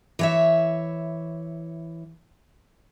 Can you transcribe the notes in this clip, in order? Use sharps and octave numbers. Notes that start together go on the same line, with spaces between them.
E3 C#5 E5